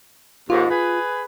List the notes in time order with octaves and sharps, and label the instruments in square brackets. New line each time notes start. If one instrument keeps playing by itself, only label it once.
[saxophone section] D#2 G#2 [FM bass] F4
[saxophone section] G#4 B4